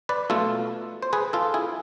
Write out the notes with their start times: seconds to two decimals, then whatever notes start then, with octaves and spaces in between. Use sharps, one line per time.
0.09 B4 D5
0.30 B2 A3 F4 A4
1.02 C5
1.13 G#4 B4
1.33 F4 A4
1.54 E4 G#4